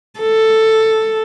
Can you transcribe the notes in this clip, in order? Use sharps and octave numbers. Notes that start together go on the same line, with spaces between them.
A4